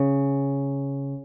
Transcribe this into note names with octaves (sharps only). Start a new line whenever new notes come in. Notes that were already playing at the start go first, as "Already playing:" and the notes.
Already playing: C#3